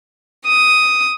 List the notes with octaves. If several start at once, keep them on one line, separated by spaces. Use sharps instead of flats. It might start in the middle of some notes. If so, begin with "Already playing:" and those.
D#6